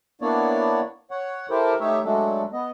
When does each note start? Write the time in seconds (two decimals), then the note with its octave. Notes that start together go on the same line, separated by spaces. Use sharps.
0.21 A#3 B3 D4 E4 C#5 D5
1.11 C#5 F#5
1.50 E4 G4 A4 A#4 C5
1.80 A3 D#4 G4 C#5 E5
2.04 F#3 G#3 A3 D4 A4
2.53 B3 D#5